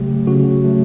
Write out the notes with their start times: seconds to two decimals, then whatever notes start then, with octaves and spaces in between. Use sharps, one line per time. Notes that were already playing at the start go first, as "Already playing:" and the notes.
Already playing: C#3 F#3 A3 G4
0.27 C#3 F#4
0.64 F#3 A3